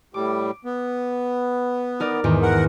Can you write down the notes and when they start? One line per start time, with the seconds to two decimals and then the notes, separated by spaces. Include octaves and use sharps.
0.14 A2 G3 D6
0.65 B3
2.00 D#4 A#4 D5
2.24 E2 G#2 D#3
2.42 A#4 F#5